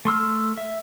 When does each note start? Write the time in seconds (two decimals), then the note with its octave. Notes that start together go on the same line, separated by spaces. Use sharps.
0.05 A3 C6 E6 F6
0.57 E5